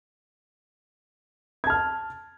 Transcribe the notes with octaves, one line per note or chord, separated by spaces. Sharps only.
A5 F6 G#6